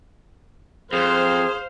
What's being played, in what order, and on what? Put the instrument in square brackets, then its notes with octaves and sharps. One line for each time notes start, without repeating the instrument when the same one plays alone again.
[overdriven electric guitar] F2 [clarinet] G#4 [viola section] C5 [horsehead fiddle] F5